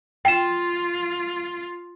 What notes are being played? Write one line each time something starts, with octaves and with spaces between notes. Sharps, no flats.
F4 G5 E7